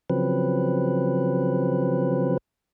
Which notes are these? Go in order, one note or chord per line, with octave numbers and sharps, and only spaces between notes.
C#3 F3 F#3 C4 B4